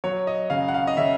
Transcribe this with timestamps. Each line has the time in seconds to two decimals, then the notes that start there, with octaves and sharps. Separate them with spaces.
0.04 F#3 C#5
0.27 D#5
0.50 C#3 F5
0.68 F#5
0.74 F5
0.87 D#5
0.97 C#3 E5